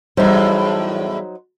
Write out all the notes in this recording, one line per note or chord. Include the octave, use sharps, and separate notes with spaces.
E2 A2 F#3 G3 D#4 C5 E5